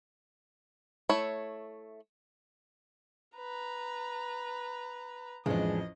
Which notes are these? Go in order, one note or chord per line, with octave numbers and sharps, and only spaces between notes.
A3 E4 C#5
B4 A#5
A1 F2 G#3 D4 D#5